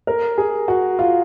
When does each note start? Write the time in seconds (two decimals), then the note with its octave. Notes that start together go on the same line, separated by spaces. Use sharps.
0.07 A#4
0.38 G#4
0.68 F#4
0.99 F4